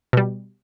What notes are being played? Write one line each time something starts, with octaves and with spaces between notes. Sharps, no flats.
B2 G3